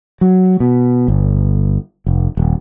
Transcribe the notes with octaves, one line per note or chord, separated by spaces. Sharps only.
F#3
B2
G1
F1
D#1